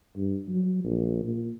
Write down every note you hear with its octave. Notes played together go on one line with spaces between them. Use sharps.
G2
F#3
A#1
A#2